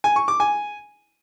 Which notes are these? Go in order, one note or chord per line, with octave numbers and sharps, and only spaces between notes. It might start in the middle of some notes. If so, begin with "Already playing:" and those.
G#5
C#6
D6
G#5